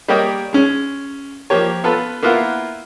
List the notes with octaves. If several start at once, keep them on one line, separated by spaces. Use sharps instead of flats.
G3 A#3 G4 C#5 D#5 G5
G#3 C#4
F3 A#3 G4 C#5
B3 F4 A4 B4
A#3 B3 E4 F4 F#5